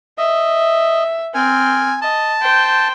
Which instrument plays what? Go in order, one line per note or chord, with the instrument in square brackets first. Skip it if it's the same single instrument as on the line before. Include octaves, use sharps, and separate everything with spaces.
[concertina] D#5 [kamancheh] E5
[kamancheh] C4 F6 [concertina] G#5
[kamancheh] D#5 [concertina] A5
[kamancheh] C5 G5